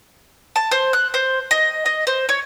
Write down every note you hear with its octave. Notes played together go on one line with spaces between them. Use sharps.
A5
C5
F#6
C5
D#5
D#5
C5
C#5